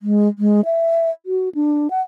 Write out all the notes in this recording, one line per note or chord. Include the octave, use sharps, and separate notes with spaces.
G#3
G#3
E5
F#4
D4
F#5